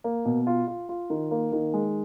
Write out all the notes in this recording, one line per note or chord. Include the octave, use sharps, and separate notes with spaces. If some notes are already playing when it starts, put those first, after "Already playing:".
A#3
B2
F4
F4
F4
D#3
A#3
D#3
G#3